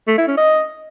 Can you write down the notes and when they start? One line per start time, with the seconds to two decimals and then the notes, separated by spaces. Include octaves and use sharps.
0.08 A3
0.17 E4
0.27 C#4
0.37 D#5